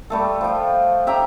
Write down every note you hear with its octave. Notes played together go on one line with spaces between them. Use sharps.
G3 A3 A4
F3 G5
G4 E5 G5 A#5